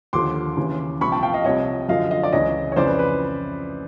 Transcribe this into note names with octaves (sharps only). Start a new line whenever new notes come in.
D#2 D3 F3 C6 D6
D#2 C#3 E3
C2 A#2 F3 B5 C#6
G5 A5
F5 G5
D#5 F5
C2 C3 F3 C#5 D#5
F#2 D3 F3 D#5 F5
D#5 F5
D5
C#2 C#3 E3 C#5 D#5
C#5
F2 C#3 E3 C5 D5
B4
B4